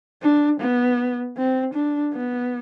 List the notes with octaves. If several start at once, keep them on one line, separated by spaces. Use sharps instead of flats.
D4
B3
C4
D4
B3